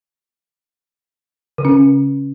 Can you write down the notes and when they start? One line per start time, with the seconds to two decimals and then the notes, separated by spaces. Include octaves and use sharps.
1.58 C#3
1.65 C#4
1.71 C#3